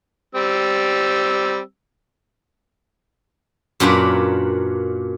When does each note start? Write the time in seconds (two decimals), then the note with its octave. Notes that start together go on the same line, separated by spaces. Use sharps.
0.35 G3 C4 E6
3.80 F#2 A#2 D4 B4